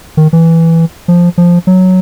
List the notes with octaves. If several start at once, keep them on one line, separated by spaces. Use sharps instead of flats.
D#3
E3
F3
F3
F#3